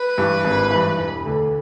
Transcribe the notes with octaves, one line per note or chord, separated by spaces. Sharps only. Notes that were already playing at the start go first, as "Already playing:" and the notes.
Already playing: B4
G2 E3
G#1
G2 E3
E1
D2 D3